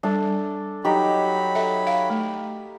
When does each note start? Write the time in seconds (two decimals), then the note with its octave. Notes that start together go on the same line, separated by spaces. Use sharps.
0.03 G3 D4 A4
0.85 F#3 D#4 G4 B5
1.55 A4 E5
1.87 F5
2.10 A3